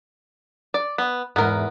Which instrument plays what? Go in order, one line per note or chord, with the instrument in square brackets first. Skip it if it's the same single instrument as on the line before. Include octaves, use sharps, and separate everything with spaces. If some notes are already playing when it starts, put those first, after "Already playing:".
[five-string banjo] D5
B3
[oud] E2 G#2 [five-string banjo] B3 A#4